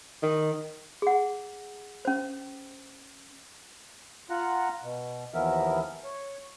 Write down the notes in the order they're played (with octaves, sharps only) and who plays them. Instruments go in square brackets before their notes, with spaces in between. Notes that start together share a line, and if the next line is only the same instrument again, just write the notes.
[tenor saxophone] D#3
[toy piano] G#4 F#5
C#4 C5
[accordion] F4 F#5 A#5
B2
D#2 E3 F3 B3 A#4 E5
C#5